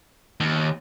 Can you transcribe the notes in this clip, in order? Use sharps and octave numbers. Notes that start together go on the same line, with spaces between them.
D#2